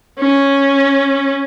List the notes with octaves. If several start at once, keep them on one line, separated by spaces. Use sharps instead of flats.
C#4